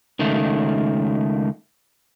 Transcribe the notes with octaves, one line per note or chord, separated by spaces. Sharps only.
C#2 D#3 A3